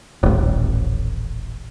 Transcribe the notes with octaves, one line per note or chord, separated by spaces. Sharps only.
D#1 A1